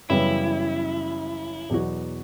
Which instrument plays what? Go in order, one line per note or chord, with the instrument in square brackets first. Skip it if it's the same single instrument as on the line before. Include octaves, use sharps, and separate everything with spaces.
[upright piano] F#2 C#3 E3 G3 B3 [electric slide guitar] E4
[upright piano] E2 B2 F#3 B3 F#4